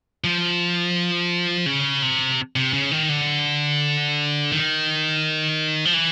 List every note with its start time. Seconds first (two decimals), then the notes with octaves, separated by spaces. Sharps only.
0.24 F3
1.66 C#3
2.02 C3
2.56 C3
2.73 C#3
2.91 D#3
3.09 D3
4.52 D#3
5.85 F3
5.94 E3